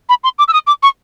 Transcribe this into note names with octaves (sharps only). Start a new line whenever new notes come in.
B5
C6
D6
E6
D#6
D6
C#6